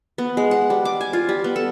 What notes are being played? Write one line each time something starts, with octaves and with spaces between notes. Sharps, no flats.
B3
G#3
F#5
G3
D6
G#5
F4
G3
B3
A4